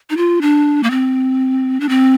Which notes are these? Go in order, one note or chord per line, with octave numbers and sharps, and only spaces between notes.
D#4
F4
D4
A#3
C4
D4
C4